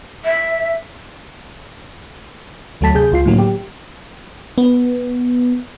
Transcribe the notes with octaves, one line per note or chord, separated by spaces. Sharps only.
E5
D2 F#3 A3 A5 B6
C3 G#4 G6
C#2 F4 C7
A2 D3 D#3 F#3 A#3
G4
B3